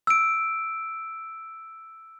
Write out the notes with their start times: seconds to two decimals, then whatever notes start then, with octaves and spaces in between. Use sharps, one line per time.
0.07 E6 D7